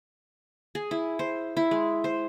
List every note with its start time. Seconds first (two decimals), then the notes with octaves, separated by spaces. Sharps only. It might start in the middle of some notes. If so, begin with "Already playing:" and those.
0.75 G#4
0.91 E4
1.19 C5
1.57 E4
1.71 G#3
2.04 C5